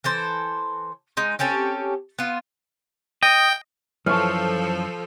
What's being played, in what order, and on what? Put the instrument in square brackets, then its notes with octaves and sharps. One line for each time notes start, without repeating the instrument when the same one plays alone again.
[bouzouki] E3 A4 C5
G#3 D#4
C4 C#4 G4 A4
B3 F4
[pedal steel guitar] D#5 [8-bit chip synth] G5
[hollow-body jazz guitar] F#2 E3 [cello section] F3 A4 [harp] A5 C#6 F6